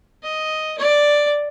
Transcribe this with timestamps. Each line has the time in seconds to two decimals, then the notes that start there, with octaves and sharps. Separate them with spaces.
0.23 D#5
0.78 D5